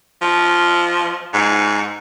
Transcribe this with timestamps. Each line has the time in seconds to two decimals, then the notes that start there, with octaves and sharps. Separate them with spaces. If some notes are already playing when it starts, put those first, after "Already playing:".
0.22 F3
1.33 G#2